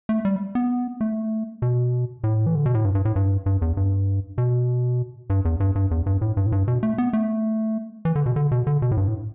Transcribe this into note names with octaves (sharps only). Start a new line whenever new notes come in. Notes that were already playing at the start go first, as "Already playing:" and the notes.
A3
G3
B3
A3
B2
A2
E3
D3
B2
A2
G2
G2
A2
G2
G2
E2
G2
B2
G2
E2
G2
G2
E2
G2
A2
G2
A2
G2
B2
A3
B3
A3
E3
D3
B2
D3
B2
D3
B2
A2
G2
A2